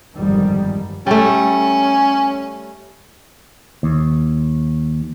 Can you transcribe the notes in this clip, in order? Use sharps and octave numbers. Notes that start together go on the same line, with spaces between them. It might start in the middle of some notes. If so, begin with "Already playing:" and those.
G1 F2 G#2 D#3 G3
G3 A3 C#4
D#2